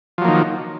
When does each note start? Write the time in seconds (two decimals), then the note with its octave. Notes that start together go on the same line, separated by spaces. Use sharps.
0.18 F3
0.21 F#3
0.25 A#3
0.28 D#3